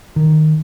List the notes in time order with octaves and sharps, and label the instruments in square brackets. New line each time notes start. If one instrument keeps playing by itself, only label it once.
[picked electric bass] D#3